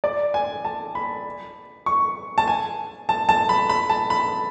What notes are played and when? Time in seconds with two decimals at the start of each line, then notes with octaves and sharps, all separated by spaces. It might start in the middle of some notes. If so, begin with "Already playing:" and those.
0.04 D5
0.34 G#5
0.65 A5
0.95 B5
1.86 C#6
2.38 A5
2.47 G#5
3.09 A5
3.29 A5
3.49 B5
3.69 B5
3.90 A5
4.10 B5